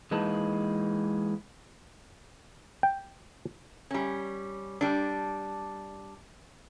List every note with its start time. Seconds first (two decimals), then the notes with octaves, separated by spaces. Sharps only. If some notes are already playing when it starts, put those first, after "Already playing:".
0.11 E3 G#3 A#3 D#4 B4 A5
2.83 G5
3.91 G3 C#4
4.81 G3 D4